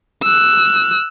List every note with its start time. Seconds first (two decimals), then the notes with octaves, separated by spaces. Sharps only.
0.23 E6 F#6